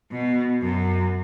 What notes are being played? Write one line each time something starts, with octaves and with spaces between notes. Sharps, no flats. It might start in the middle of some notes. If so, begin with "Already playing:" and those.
B2
F#2